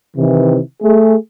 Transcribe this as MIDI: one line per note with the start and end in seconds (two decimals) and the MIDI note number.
0.17 0.60 48
0.17 0.60 51
0.17 0.60 52
0.82 1.15 57
0.82 1.15 68